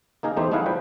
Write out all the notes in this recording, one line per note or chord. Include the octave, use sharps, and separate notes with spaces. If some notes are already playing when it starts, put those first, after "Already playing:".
A#3 D#4 G#4 A#4
E2 A3 D#4 G4 C5
A3 D#4 E4 G#4 F5 F#5
F3 G3 B4 G5